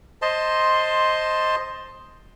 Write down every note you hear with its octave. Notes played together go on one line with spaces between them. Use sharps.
C5 D#5 A5 C6